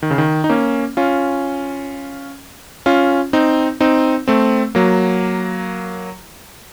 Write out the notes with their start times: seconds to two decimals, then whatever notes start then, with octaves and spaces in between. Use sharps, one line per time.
0.03 D#3
0.11 C#3
0.18 D#3
0.44 D#4
0.49 A#3 C#4
0.97 C#4 F4
2.86 C#4 F4
3.33 C4 D#4
3.80 C4 D#4
4.28 A3 C4
4.75 F#3 A#3